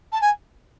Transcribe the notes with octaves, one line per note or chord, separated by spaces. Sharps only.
A5
G#5